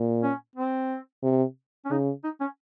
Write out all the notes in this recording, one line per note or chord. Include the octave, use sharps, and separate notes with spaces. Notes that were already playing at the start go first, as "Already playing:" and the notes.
Already playing: A#2
C#4
C4
C3
C#4
C#3 D#4
D#4
C#4